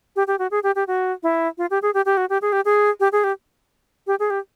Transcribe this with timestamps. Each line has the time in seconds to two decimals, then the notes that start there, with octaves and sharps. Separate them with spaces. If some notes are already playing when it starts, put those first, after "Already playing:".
0.16 G4
0.27 G4
0.39 F#4
0.51 G#4
0.63 G4
0.75 G4
0.87 F#4
1.23 E4
1.58 F4
1.71 G4
1.82 G#4
1.94 G4
2.06 G4
2.17 F#4
2.30 G4
2.42 G#4
2.52 G4
2.65 G#4
3.00 G4
3.12 G#4
3.24 G4
4.07 G4
4.20 G#4
4.30 G4